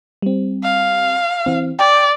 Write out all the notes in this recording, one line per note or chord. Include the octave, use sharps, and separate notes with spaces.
G3 C4
F5
E3 C4
D5 G5